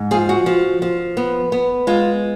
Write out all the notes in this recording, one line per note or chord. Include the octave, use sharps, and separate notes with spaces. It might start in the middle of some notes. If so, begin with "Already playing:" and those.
Already playing: G#2
F3 F4 G#4
F#4
F3
F3
B3
B3
G#3 F4